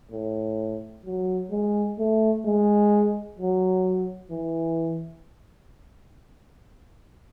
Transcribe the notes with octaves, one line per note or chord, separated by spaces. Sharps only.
A2
F#3
G#3
A3
G#3
F#3
E3